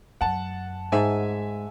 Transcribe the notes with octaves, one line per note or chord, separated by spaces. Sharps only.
F#2 F#5 A5
G#2 E5 G#5